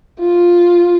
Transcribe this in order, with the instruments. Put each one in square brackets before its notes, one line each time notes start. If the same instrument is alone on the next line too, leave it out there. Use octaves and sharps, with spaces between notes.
[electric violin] F4